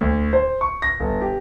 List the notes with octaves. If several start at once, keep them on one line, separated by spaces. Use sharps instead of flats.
D2
C5
C#6
A#6
G1
G4